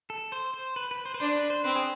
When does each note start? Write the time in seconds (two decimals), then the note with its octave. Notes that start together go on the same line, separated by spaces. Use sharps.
0.10 A4
0.32 C5
0.54 C5
0.76 B4
0.91 B4
1.05 C5
1.14 B4
1.20 D4 C5
1.35 B4
1.50 C5
1.64 C4 B4
1.76 G#4